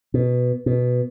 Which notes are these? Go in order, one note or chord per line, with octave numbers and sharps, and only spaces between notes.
B2
B2